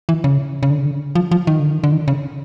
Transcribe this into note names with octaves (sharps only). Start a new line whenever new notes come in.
E3
C#3
C#3
D3
C#3
D3
F3
F3
D#3
D3
D#3
D3
D#3
C#3